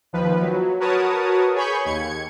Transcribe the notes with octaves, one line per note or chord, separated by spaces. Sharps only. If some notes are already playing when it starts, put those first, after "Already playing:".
D#2 F3 B4
F#3
F#4 A#4 B4 C#5 A5 D#6
G#4 C#5 G#5 B5 C#6 G6
D#2 G#6 C#7